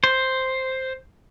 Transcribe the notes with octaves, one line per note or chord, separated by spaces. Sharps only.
C5